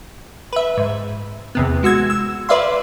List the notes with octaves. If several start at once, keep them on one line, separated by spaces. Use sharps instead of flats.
B4 E5
G#2
E2 C3 B3
G#3 F#4 E6 G#6
E6
B4 D5 E5 F5 C6